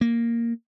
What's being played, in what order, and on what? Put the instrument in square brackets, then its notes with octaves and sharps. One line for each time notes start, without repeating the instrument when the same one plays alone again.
[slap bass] A#3